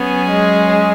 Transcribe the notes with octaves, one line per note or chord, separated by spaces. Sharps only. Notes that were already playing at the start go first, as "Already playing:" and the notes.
Already playing: F#3 B3 C#4 G#4
G#3